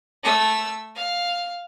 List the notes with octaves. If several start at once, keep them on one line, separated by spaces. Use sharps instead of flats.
A3 E6
F5